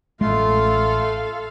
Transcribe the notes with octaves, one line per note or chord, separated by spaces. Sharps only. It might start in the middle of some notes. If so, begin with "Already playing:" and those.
A1 G#3 A3 F4 A4 F5 C6